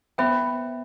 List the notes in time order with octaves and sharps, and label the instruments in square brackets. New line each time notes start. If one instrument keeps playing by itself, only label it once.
[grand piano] B3 [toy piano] C5 E5 G5 B5